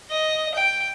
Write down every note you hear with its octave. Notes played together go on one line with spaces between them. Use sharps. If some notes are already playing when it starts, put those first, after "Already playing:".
D#5
G5